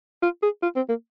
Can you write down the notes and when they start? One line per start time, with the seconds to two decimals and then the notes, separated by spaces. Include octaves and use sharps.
0.23 F4
0.43 G#4
0.63 F4
0.76 C4
0.89 A#3